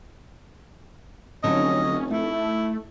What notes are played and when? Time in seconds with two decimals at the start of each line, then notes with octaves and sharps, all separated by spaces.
1.44 F1 D3 F#3 C#4 D#4 D#5
2.11 A3 D#4 E4